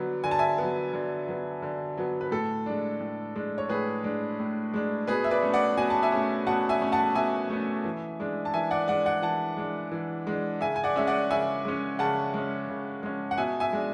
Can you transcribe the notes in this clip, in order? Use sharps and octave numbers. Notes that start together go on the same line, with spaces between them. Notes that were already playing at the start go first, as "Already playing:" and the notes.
Already playing: D3 F#3 B3
D3 G#5
A5
E5 G#5
F#3 B3
D3
F#3 B3
D3
F#3 B3
B4
A2 A4
G#3 D4
A2
G#3 D4
C#5
A2 G#4 B4
G#3 D4
A2
G#3 D4
B2 G#4 B4
E5
B4 D5
A3 C#4
D5 F#5
B2 G#5
A5
E5 G#5
A3 C#4
B2 F#5 A5
E5 G#5
A3 C#4
F#5 A5
B2 E5 G#5
A3 C#4
E3
G#3 D4
A5
E3 E5 G#5
D5 F#5
G#3 D4 D5 F#5
D5 F#5
E3 F#5 A5
G#3 D4
E3
G#3 D4
C#3 E5 G#5
G#5
D5 F#5
G#3 C#4 E5
D5 F#5
C#3 E5 G#5
G#3 C#4
C#3 F#5 A5
G#3 C#4
C#3
G#3 C#4
F#5
B2 E5 G#5
E5 G#5
G#3 D4